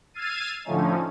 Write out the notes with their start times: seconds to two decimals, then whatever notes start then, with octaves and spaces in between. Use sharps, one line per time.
0.14 E6 F6 G#6 A6 C7 D#7
0.65 A2 D3 F3 A3 C#4 D#4